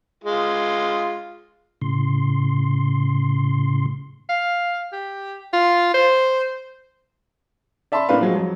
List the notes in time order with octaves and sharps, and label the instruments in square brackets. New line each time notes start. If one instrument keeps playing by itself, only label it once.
[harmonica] G#3 F4
[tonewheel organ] A2 C#3 C6
[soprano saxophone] F5
G4
F4
C5
[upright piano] D5 E5 A5 B5 C6
A2 A#3 D4 B4 F5
F3 F#3 G#3
F2 F#3